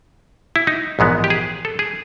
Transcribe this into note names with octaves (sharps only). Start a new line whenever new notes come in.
E4
D#4
A#1 G#2 E3 G#3 B3
G4
G#4
A4
G#4